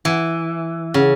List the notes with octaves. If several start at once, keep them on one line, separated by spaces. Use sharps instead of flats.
E3
C#3